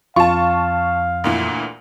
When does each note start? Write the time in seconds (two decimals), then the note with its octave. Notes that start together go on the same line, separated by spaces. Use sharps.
0.16 F2 F4 F5 A5 C#6
1.24 D2 A#2 E3